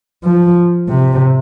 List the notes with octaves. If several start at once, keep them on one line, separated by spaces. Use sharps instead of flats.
F3
C3